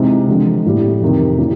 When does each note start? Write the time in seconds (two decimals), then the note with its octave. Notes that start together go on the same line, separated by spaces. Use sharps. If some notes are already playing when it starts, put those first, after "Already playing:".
Already playing: C3 E3 G#3 C4 D#4
0.28 D3 F3 G#3 C4
0.65 A2 E3 G3
1.01 F2 C3 D#3
1.38 C#3 E3 G3 A#3